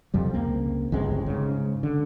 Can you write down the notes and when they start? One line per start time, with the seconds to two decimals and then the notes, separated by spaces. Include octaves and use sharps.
0.14 F2 C3 G3
0.33 C#2 A#3 C4
0.92 G1 C#2 G#3 C4
1.26 G#2 C#3
1.83 D3